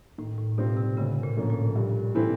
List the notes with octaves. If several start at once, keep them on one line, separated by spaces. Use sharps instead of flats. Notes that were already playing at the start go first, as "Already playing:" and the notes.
A2 D#3
A2
B2 G3 C4 F4
C3
D2 C#3
A#2
A2 D3 F3 A#3 C#4
A#2
G2
E3 A3 C4 E4